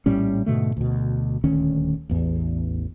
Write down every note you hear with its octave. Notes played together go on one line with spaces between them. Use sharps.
A#1 A2 G3 C#4
G#2 B2 D3 A3
D2 B2
D#1 D2 D#3 C#4
A1 E2